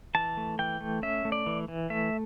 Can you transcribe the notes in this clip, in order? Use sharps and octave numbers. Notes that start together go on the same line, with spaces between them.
E3 A5
A3
E3 G5
A3
C#4 E5
A3
D5
E3
E3
A3 E5